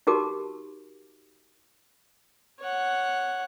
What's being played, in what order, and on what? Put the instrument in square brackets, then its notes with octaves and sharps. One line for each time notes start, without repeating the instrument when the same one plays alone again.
[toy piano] D#4 F#4 G4 A#4 A5 D6
[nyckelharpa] C#5 F#5